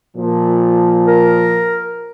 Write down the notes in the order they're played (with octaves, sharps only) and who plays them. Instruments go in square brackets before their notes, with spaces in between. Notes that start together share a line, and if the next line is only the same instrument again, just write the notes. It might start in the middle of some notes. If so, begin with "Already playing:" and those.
[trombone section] A#2 F3
[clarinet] A#4